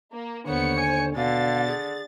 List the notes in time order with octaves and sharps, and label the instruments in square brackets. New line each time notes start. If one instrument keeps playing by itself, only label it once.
[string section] A#3
[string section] D#2 C#5 C#7 [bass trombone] D3 [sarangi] B3 [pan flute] C5
[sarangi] G#5
[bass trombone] B2 [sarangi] D3 [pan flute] F5 [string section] A6
[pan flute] G#4